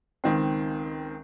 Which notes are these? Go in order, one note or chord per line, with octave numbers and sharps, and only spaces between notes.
C#2 D#3 C4